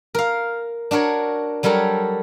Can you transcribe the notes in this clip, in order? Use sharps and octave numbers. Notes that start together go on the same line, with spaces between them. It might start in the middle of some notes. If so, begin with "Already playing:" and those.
A#4 F5
D4 F#4 A#4 C#5
F#3 G3 A4 A#4 C#5